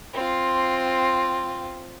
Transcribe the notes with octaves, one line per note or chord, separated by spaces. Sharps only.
C4 F4